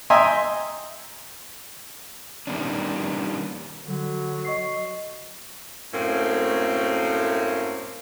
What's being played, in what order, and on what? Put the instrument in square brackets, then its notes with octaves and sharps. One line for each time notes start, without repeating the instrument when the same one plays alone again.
[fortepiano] D#5 E5 G5 G#5 A#5 C6
[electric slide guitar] D#3 G3 A#3 B3 C#4 D4
[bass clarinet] D3 [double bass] F#3
[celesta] D#5 C#6 C7
[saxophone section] F#2 A2 A3 A#3 C4